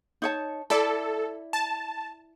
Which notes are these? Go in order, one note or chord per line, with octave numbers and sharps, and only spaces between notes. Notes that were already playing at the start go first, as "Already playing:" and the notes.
D#4 C#5 A5
E4 A4 D5
A5